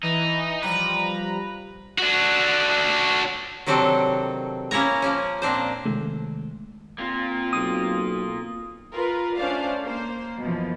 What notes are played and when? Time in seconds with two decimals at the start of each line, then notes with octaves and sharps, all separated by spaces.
0.03 E3 D#4
0.62 F3 G3 B4 A#5
1.98 D4 F#4
3.67 C3 D#3 F#3 C4 D4 A4
4.71 A#3 C#4 E4 C#5 A#5
5.02 F3 A#3 C#4
5.42 A#2 C4 D4 C5
5.85 C3 D#3 G#3 A3
6.98 A#3 C4 F4
7.53 B1 D#6
8.92 F4 A#4 B4
9.37 A3 C#4 D4 C5 D5 F5
9.84 A#3 C5
10.41 F#2 B2 E3 F3